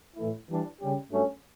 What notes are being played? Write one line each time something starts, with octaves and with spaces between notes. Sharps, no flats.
A2 E3 A3 E4
E3 G3 D4
C#3 G3 C#4 G4
G2 F#3 A3 C#4